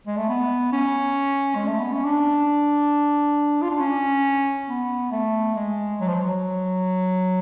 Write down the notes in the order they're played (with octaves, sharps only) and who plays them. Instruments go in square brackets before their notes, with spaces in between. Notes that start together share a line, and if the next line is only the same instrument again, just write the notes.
[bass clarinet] G#3
A3
B3
C#4
G#3
A3
B3
C#4
D4
F4
D4
C#4
B3
A3
G#3
F#3
F3
F#3